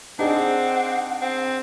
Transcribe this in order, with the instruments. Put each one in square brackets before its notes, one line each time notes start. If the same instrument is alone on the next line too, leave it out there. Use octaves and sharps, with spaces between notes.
[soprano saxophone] C4 [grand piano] D4 D#4 G#4 [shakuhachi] F#5
[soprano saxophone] C4